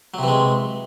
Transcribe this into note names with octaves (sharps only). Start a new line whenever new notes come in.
C3 E3 F#3 G#3